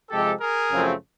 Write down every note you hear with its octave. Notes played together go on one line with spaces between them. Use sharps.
C3 F3 G#3 G4 A4
G#4 A#4
F#2 C#3 F3 A3 C4